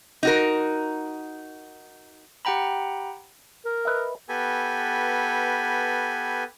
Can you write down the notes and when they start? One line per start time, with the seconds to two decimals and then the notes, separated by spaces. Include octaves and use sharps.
0.23 D#4 F#4 A#4
2.45 G4 F#5 G5 A#5 B5
3.65 A#4
3.85 B4 D#5 E5
4.29 B3 G4 A4 B4 G#5